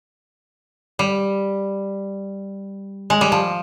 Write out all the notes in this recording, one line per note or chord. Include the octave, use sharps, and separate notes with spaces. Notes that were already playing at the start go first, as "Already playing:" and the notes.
G3
G#3
G3
F3